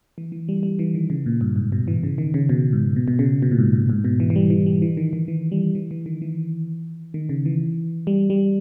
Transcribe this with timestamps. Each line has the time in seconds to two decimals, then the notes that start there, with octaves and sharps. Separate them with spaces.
0.18 E3
0.32 E3
0.49 G3
0.63 G3
0.79 E3
0.95 D#3
1.10 C#3
1.26 A#2
1.41 G2
1.56 G#2
1.72 B2
1.88 E3
2.03 C#3
2.18 D#3
2.34 C#3
2.49 B2
2.73 G#2
2.96 B2
3.08 B2
3.19 C#3
3.42 B2
3.51 A#2
3.59 G#2
3.73 A#2
3.90 G#2
4.05 B2
4.20 E3
4.30 E3
4.36 G3
4.50 E3
4.66 G3
4.82 E3
4.97 D#3
5.13 D#3
5.28 E3
5.52 G3
5.75 E3
5.91 E3
6.06 D#3
6.22 E3
7.14 D#3
7.29 C#3
7.46 E3
8.07 G3
8.30 G3